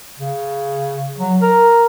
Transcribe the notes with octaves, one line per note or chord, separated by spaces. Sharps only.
C#3
F#3
A#4